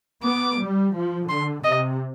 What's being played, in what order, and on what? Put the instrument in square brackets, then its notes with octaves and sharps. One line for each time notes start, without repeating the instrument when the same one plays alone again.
[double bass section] B3 [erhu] D6
[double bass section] G3
F3
[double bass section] D3 [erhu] C6
[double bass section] C3 [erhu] D#5